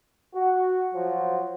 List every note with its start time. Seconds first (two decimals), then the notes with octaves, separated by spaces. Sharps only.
0.35 F#4
0.95 F3 F#3 F4